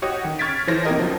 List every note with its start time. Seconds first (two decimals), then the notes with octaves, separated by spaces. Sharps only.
0.02 F#4 G4 C#5 D#5 F#5 D#6
0.24 D#3
0.39 C#6 F6 G#6 A6 B6 D7
0.67 E3 F3 C5 C#5 A#6
0.85 C3 A#3 D#4 G4 A#4 D#5
0.97 C#2 F3 F#3